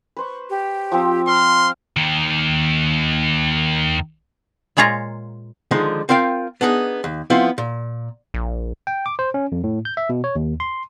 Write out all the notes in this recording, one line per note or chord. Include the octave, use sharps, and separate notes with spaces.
B4 C5 C#6
G4
F3 C4
A5 C6 F6
D#2 D#3
A#2 G#3 F4 C#5 A#5
D3 D#3 F3 G#3 D#4
C4 F4 A#4 F5 G5
B3 D4 D#4 G#4
D#2
F3 B3 C4 E4 F4
A#2
A#1
G5
D6
C5
C#4
F2
A2
G6
E5
B2
C#5
D#2
C6